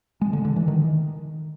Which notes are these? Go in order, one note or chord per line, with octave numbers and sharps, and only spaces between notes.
G#3
D3
D3
E3
D#3